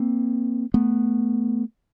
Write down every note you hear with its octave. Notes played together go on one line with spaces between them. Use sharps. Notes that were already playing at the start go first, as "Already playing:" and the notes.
Already playing: A#3 C4
A3 B3